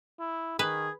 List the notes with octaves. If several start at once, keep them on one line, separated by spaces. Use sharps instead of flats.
E4
D#3 G#4 B4